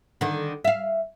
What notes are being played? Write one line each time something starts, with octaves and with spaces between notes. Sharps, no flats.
D3 D#3
E5 F5